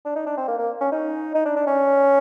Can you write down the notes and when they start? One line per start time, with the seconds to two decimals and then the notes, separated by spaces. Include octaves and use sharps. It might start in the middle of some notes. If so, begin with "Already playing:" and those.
0.05 D4
0.16 D#4
0.26 D4
0.37 C4
0.48 A#3
0.59 A#3
0.80 C#4
0.92 D#4
1.35 D#4
1.45 D4
1.56 D4
1.67 C#4